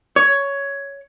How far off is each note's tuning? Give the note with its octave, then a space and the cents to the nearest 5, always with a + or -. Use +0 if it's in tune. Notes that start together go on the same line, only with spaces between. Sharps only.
C#5 +10